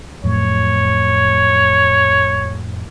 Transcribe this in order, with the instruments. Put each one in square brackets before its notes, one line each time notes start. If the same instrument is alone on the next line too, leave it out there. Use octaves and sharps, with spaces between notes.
[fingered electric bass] F2 A2 F#3 [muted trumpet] C#5